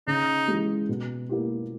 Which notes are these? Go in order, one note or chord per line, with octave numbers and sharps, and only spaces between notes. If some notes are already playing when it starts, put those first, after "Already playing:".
C#3 D#4
E3 G#3
B2
A#3 E4 G4